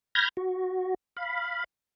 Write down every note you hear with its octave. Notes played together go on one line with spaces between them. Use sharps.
B5 F6 G6 G#6 A#6
F#4
F5 B5